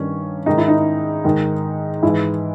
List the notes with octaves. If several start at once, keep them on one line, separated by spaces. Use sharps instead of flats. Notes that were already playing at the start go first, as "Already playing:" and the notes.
Already playing: G2 D#3 C#4
G#2 D#3 D#4
E4
D#4
G#2 D#3
G#2 E3 E4